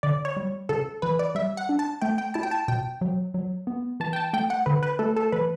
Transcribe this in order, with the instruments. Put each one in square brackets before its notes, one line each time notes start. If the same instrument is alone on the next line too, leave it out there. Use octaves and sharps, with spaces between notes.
[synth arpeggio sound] D3 [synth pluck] D5
[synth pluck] C#5
[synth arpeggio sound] G3
[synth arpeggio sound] C#3 [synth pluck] A4
[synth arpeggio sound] E3 [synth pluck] B4
[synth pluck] D5
[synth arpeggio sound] G3 [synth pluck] E5
[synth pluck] F#5
[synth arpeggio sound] D4
[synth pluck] A5
[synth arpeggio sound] A3 [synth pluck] G5
[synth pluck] G5
[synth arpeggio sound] E4 [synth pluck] A5
[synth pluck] G5
A5
[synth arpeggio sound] B2 [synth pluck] G5
[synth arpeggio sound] F#3
F#3
B3
[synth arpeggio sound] E3 [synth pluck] A5
[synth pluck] G5
A5
[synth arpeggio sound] A3 [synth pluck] G5
[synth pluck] F#5
[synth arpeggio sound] D3 [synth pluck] B4
[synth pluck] B4
[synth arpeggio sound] A3 [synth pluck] A4
[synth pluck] A4
[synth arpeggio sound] E3 [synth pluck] B4